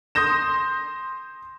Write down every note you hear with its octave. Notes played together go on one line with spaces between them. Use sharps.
C6 D#6 G6 A#6 E7